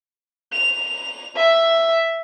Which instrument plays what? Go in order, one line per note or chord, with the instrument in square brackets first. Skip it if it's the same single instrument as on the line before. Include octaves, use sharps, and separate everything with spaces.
[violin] F7
E5